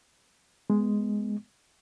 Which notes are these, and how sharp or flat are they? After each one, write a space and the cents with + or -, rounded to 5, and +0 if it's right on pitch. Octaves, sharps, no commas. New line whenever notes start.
G#3 +0 B3 +0